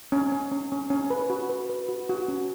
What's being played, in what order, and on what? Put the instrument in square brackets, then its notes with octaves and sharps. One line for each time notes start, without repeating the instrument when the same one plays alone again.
[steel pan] C#4
C#4
C#4
C#4
C#4
B4
F#4
B4
B4
F#4
F#4
C#4